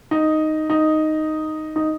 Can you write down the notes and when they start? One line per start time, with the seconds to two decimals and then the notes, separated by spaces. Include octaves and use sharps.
0.11 D#4
0.70 D#4
1.76 D#4